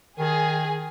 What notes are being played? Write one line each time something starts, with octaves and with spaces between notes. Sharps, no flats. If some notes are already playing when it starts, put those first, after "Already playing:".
D#3 G#4